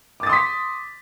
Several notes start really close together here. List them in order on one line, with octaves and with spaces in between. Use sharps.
D6 A6 D#6 C6 B6